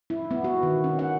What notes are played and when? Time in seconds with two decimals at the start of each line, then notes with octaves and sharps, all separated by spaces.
0.10 E4
0.31 B3
0.44 F#4
0.63 D#3
0.84 C#4
0.99 F#5